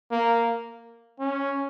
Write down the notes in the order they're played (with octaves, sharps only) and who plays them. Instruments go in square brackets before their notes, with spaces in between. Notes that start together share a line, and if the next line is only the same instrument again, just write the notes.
[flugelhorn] A#3
C#4